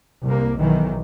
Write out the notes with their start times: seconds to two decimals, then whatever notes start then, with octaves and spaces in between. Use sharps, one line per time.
0.25 C2 A#3
0.59 B1 D#3 E3